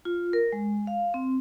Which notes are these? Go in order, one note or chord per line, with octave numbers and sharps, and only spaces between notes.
F4
A#4
G#3
F5
C4